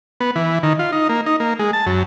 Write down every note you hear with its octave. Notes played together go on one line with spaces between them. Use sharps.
B3
E3
D#3
F4
D#4
A#3
D#4
A#3
G#3
A5
F#2